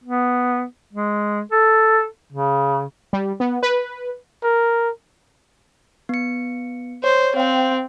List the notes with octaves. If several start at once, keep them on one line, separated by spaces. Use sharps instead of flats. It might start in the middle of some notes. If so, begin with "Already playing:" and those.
B3
G#3
A4
C#3
G3
B3
B4
A#4
B3 C#7
C5 C#5
C4 F5 G5